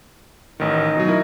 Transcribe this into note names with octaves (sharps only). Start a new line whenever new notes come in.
A1 D#3 D#4
B2 F#3
E4 A#4